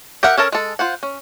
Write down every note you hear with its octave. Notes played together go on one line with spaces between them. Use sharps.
G4 A#4 E5 F#5
C#4 A4 A#4 A5
G#3 A4
F4 C5 F#5
C#4